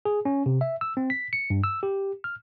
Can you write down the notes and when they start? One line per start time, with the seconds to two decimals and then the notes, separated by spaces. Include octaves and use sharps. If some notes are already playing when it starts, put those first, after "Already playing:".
0.05 G#4
0.25 C#4
0.46 C3
0.61 E5
0.81 E6
0.97 C4
1.10 B6
1.33 C#7
1.50 G2
1.64 E6
1.83 G4
2.24 F6